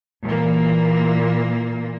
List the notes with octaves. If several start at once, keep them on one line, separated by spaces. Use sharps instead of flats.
A#2 E3 A#3